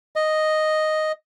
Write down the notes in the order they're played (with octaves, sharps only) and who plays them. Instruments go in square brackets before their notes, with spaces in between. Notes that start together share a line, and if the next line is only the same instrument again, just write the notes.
[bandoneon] D#5